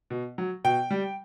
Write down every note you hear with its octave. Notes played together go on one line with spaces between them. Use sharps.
B2
F#3
B2 G5
G3